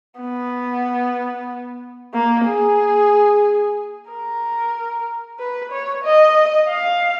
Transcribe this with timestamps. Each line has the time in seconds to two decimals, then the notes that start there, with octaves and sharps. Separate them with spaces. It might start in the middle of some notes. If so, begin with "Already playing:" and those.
0.20 B3
2.14 A#3
2.47 G#4
4.10 A#4
5.40 B4
5.72 C#5
6.05 D#5
6.68 F5